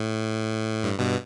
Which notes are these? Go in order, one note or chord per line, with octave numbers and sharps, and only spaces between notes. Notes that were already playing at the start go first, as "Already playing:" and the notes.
Already playing: A2
G2
G2 B2